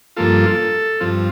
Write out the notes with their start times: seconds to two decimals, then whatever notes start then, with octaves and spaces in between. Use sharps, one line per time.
0.16 G2 F3 A#3 F4 A4
1.00 G2 F3 C4 F4